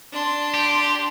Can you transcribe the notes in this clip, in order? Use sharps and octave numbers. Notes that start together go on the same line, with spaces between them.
D4 C6
G4